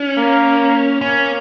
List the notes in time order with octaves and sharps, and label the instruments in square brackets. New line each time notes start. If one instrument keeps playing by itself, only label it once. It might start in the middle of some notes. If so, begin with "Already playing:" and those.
Already playing: [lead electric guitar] C#4
[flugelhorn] A#3
[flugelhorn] A#3 [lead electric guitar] C#4